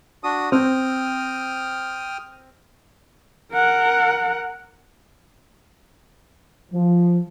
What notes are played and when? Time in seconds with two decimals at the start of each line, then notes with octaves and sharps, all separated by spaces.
0.24 D4 F#4 D#6
0.52 C4 G5 D#6 F6
3.53 A#4 F#5
6.72 F3